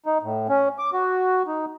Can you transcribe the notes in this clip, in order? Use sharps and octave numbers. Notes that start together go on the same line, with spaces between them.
D#4
A2
C#4
D6
F#4
D#4